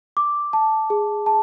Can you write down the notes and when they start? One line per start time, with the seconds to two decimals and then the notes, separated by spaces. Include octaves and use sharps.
0.17 D6
0.53 A5
0.90 G#4
1.26 A5